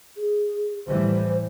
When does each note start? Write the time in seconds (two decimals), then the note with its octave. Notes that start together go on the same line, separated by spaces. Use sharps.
0.17 G#4
0.87 A2 E3 G3 C5